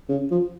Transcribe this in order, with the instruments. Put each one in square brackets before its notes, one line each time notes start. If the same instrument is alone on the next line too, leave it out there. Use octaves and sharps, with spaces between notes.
[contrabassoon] C#3
F3